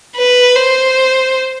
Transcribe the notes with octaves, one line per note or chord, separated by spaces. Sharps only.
B4
C5